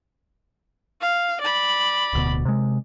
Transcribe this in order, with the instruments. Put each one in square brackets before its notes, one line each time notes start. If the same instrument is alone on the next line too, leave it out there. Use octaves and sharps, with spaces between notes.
[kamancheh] F5
D5 B5
[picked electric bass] D1 D2 B2
C3 G#3